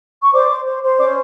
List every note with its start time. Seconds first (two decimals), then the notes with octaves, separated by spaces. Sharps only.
0.22 C#6
0.33 C5 D5 D6
0.49 C5
0.66 C5
0.82 C5
0.99 C#4 D5 D6